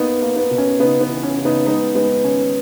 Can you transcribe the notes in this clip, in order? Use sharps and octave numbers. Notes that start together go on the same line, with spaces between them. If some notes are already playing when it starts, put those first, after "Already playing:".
Already playing: A#3 B3 D#4
A#3
B3
B2
C#4
C#3 B3 D#4
B3
E3
C#4
C#3
B3 D#4
G#3 B3 D#4
G#3 B3
D#3 C#4